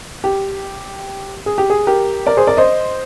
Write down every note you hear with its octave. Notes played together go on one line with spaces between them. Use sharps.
G4
G#4
G4
G#4
G4 A#4
A#4 D5
G#4 C5
A#4 D5
C5 D#5